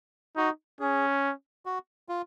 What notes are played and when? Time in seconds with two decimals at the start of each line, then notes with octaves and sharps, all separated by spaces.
0.36 D#4 F#4
0.80 C#4 G#4
1.66 F#4
2.09 F4